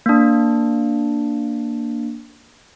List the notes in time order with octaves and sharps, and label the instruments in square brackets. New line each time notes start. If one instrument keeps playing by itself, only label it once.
[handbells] A#3 D4